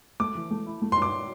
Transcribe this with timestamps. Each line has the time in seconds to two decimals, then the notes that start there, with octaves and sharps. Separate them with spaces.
0.20 A3 D6
0.35 E3
0.51 A3
0.66 E4
0.82 A3
0.92 C6
0.97 G2 D6